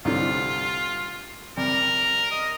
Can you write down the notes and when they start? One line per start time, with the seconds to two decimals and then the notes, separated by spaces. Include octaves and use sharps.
0.05 C2 D3 F4
1.57 C3 G3 A#4
2.32 D#5